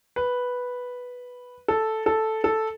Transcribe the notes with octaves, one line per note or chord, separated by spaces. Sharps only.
B4
A4
A4
A4